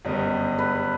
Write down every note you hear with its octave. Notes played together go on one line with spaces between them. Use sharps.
G1 F#2 D#3 G3 B3 D#5
B4